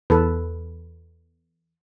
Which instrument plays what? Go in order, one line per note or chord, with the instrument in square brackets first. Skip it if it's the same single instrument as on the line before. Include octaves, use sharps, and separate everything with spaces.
[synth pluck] E2 [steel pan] A4 B4